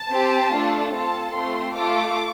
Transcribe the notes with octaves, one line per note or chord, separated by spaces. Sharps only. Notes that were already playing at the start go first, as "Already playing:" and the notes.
Already playing: A5
C4 G4
A3 D4 F4 A4
C4 F4 A4 A5
A3 C4 F4 C6
A3 F4 A4 D6